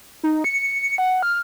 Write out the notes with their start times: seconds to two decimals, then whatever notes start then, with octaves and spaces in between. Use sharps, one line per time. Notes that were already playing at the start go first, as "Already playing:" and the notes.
0.23 D#4
0.44 C#7
0.98 F#5
1.22 F6